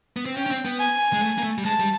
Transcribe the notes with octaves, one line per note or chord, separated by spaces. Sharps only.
B3
C4
C#4 G5
C#4
C4
B3
G#5
G#3
A3
A#3
A3
G3
G#3 A5
G3